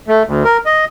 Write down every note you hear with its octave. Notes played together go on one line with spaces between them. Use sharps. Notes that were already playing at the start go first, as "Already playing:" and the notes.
A3
D2
A#4
D#5